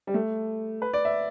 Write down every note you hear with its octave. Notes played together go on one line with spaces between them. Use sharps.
G3
A3
B4
D5
E5